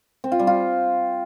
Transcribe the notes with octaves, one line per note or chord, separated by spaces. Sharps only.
C4
F4
G3
F4